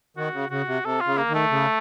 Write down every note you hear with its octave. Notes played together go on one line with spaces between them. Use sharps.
D#3 F#4
C#3
C#3 F#4
C3
C3 A4
F4
C#3
A#3
D#3 A3
C#3